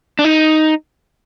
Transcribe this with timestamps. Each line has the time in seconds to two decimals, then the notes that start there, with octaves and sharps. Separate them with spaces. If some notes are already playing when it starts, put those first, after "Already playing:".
0.19 D4
0.24 D#4